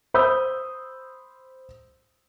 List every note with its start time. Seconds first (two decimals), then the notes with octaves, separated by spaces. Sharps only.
0.14 C5 B5 D#6 E6 G6